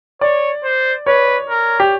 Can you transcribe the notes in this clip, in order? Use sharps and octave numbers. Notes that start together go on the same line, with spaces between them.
C#5 D5
C5
B4 C#5
A#4
G4